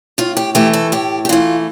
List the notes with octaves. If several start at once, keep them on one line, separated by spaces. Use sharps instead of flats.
A2 F4
G4
E3 A3 G4
A4
A2 G4
G4
E3 A3 F4